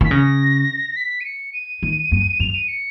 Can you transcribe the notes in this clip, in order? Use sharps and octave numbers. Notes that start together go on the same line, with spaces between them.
D#3 B6
C#3 A#6
B6
D#7
C#7
D#7
D#3
F#2
F#2 F7
D#7
C#7